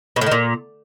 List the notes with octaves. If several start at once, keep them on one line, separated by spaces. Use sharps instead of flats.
B2
A2
D#3
A#2